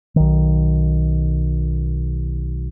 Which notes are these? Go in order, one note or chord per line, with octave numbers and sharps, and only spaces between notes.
B1 D#3